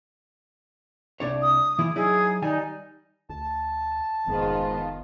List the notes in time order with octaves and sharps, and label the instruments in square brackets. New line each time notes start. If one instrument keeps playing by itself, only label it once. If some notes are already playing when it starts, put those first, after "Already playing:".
[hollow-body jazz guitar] C2 D4 C#5
[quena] D#6
[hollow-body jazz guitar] E3 E4
[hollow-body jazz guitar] F#3 D#4 E4 [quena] G#4
[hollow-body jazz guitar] D#3 G3 G#5 [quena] D#4
[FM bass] D2 [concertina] A5
[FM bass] F1 [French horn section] G#2 [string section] D#3 B3 F4